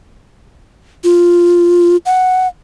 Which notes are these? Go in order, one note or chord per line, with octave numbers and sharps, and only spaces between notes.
F4
F#5